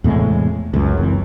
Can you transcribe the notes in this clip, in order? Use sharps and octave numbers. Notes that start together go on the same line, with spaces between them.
E2 A2 C3 G#3
C#2 F#2
F#1 F#2 E3 C4